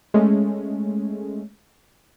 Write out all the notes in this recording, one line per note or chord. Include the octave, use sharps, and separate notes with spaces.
G#3 A3 C#4